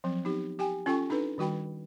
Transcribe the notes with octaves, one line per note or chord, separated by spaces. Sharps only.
F3 F#3 C4
B3 D#4 G4
G4 G5 G#5
C#4 F4 A4 G5 G#5 C#6
D4 D#4 A4 B4
D#3 G3 F#4 G5 B5